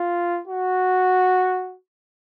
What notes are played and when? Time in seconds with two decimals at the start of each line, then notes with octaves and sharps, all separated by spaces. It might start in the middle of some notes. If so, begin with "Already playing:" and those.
Already playing: F4
0.47 F#4